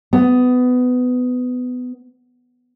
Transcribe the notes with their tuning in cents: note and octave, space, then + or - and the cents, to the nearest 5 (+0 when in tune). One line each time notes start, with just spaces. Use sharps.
B3 +20